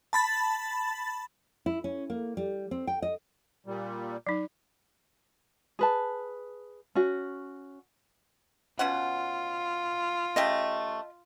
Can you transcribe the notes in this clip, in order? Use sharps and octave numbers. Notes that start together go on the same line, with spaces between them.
A5 B5 A6
E4
C#4
A#3
G3
C4
G5
D#5
A#2 G3
F#3 D#4
G#4 B4 A5
C#4 F#4
B2 C#4 F4 F#5
C#3 A3 G4 D#5